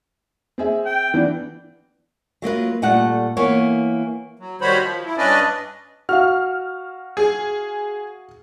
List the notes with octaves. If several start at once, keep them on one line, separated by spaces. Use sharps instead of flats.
C4 G#4 E5
G5
E3 B3 D4
F#3 A#3 F4 B4
A#2 G3 A3 A4 F#5
E3 A#3 B3 C#5
F#3
D#3 G3 F#4 C5 C#5 B5
F3
E4
G2 C#4 D4 B4 D5 D#5
F#4 F5 F6
G#4